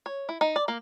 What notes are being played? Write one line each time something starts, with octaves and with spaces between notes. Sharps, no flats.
C#5
E4
D#4
D5
A#3